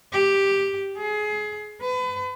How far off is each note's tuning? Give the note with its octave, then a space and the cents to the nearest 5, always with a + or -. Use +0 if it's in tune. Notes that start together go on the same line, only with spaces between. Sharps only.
G4 +0
G#4 +25
B4 +35